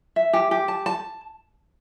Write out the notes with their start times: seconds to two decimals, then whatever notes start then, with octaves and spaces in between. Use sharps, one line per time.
0.16 E5
0.33 G4
0.51 G4
0.68 A5
0.86 A5